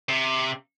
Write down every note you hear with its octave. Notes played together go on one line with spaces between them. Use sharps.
C3